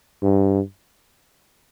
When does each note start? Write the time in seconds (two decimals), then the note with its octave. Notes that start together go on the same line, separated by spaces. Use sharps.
0.23 G2